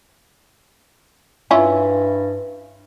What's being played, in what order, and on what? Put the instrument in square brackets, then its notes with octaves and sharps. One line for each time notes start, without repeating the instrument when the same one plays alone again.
[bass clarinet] G2 [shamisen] C#4 E4 F4